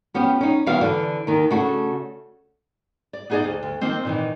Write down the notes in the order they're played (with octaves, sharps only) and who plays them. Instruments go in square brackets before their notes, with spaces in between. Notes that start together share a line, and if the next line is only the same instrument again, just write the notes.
[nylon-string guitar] F3 B3 C#4 G4
C#4 D#4
D#2 B2 E3 G3 F#4 F5
D3 E3 D4
D#2 D#3
C#3 A3 D4 F#4
D5
B3 D#4 G#4 A#4 D5 D#5
D2
D2
D#3 F3 A#3 C4 D#4
A#2 D#3 E3